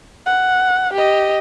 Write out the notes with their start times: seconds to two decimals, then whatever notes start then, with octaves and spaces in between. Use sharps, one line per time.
0.26 F#5
0.93 G4 D#5